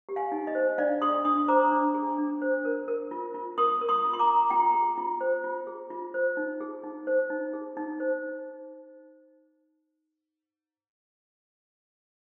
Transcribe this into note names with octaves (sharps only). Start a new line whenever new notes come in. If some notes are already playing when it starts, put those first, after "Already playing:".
G4
F5 G#5
D#4
D#5
C5
D4 D5 F5
G#4 C6 D#6
D4 C6 D#6
C5 A#5 D6
D4
G#4
D4
C5
A#4
A#4
F4
F4
A#4 C6 D#6
A#4
C6 D#6
F4
C6
A#5 D6
F4
F4 G5 A#5
G#4
F4
C5
F4
G#4
F4
C5
D#4
G#4
D#4
C5
D#4
G#4
D#4
C5